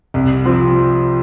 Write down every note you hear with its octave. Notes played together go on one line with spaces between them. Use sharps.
C2
C3 F3 C4